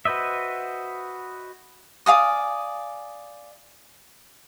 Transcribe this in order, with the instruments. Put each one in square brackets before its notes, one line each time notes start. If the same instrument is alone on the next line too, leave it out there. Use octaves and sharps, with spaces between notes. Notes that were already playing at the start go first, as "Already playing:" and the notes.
[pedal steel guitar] F#4 B4 C5 D#5 E5
[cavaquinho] D5 F5 G#5 D#6